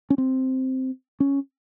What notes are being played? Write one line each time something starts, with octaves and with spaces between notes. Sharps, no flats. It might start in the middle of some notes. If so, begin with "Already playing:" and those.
C#4
C4
C#4